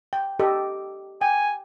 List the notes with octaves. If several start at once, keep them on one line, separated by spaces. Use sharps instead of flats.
G5
G4 A4 D#5
G5 G#5